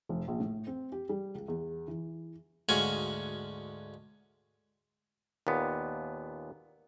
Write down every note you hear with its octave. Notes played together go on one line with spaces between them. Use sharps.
F1
A#1
A2
C4
G4
G3
C#2
E2
E3
D2 G#2 C#4 F#4 F5 G#5
D#2 A#2 B3